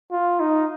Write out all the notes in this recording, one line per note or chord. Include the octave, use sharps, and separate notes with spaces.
F4
D#4